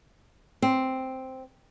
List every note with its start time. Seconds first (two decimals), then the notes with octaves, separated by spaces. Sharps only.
0.62 C4